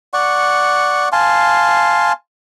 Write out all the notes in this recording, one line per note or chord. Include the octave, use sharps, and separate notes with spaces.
D5 F#5 C#6
F5 G#5 A5 C6